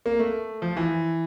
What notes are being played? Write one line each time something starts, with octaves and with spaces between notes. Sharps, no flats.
A#3
A3
F3
E3